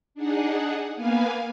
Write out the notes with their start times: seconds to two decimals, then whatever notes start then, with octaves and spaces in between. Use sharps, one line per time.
0.15 D4 D#4 G#4 F#5
0.95 A#3 B3 B4 F5 G#5